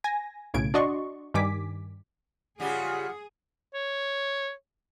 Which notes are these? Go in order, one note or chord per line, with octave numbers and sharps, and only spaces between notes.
G#5 A#6
B1 A2 C#3 G#6 D7
D4 F#4 D5 D#5 C6 C#6
G2 D#3 G3 G#5 D6 B6
C#3 G3 F4 G4 G#4 F#5
C#5